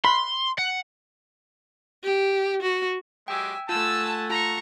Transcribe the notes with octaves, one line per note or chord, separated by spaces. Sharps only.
B5 C6
F#5
G4
F#4
F#3 G#3 G4 E5 G5 G#5
A3 F4 F#5 G#5 A5 E6
F4 A5 A#5 C#6 A#6